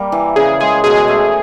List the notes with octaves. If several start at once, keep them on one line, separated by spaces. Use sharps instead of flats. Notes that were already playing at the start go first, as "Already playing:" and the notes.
Already playing: G3 A#3
E3
C#3 G#4
G#3 G#4
B2 G#4
A3